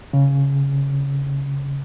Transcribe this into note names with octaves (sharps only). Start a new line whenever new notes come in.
C#3